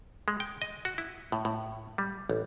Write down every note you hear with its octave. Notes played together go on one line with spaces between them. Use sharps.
G#3
G5
D#5
F#4
E4
A2
A2
G3
A1